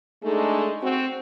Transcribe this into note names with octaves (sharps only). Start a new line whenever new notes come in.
G#3 A3 D4 D#4 G#4 A4
C4 F#4